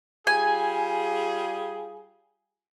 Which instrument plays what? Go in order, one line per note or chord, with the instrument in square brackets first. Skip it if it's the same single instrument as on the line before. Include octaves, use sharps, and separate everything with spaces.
[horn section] G3 F4 G#4 [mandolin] G#5